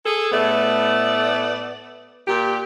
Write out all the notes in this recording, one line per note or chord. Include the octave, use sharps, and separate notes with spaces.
G#4 A4
A2 A3 B3 D5
A#2 G4